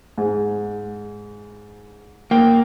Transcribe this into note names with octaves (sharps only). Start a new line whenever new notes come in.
G#2
A#3 G5